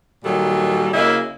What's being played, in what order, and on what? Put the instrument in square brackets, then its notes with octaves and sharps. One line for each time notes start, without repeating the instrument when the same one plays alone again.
[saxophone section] A#2 D#3 F#3 G3 A4
C#3 F#3 A#3 E4 D#5